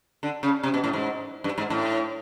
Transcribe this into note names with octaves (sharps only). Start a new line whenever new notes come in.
D3
C#3
C3
B2
A2
G#2
G2
G#2
A2